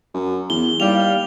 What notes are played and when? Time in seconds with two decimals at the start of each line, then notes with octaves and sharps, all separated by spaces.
0.14 F#2
0.50 E2 G7
0.80 D#2 G3 F5 F7